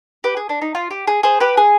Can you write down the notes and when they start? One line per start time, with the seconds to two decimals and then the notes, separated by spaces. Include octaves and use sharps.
0.24 G4 B4
0.37 G#4
0.49 D4
0.62 D#4
0.75 F4
0.91 G4
1.07 G#4
1.23 G#4 C5
1.40 G4 B4
1.57 G#4